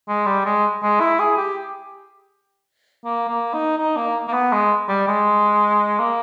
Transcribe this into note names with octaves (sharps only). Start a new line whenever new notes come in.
G#3
G3
G#3
G#3
E4
G#4
G4
A#3
A#3
D#4
D#4
A#3
A#3
B3
G#3
G3
G#3
A#3